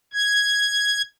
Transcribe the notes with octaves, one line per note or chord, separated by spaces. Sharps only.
G#6